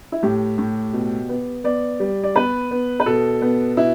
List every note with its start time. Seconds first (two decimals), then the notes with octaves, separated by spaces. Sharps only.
0.12 E4
0.23 A2 G4
0.58 A2
0.93 B2
1.29 B3
1.64 B3 D5
2.00 G3
2.24 D5
2.35 B3 B4
2.71 B3
3.00 B4
3.06 B2 A4
3.42 B3
3.77 B2 E4